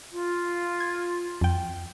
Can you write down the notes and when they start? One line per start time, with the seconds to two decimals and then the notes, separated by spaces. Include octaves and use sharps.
0.13 F4
0.80 G#6
1.41 F2 G5